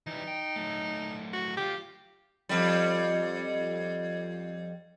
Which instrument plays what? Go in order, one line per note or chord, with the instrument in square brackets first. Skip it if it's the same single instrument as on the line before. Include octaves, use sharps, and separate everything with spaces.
[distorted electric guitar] E3 G3 [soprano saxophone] D#4
[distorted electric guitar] G5
F#3 A3
[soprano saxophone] F#4
[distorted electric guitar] D3 F4 [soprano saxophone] G4
[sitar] F2 G3